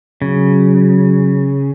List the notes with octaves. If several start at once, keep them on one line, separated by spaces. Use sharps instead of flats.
C#3 F#3